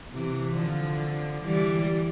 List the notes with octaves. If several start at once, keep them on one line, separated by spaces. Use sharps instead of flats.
C3 E3
D3 F3
E3 G3